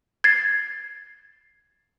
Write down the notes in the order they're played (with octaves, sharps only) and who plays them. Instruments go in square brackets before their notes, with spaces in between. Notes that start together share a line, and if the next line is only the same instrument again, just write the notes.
[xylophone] G#6 A6 C7